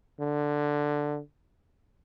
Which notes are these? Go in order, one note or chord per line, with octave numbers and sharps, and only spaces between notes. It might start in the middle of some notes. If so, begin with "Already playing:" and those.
D3